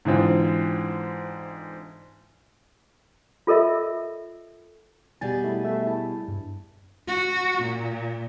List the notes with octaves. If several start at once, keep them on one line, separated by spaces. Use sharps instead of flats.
G#2 D3 E3 C4 F4
F4 A4 A#4 D#5 E5
B2 G3 G#4 G#5 A6
A3 E4
A3 E5
E4 A5
G2
F#4
A#2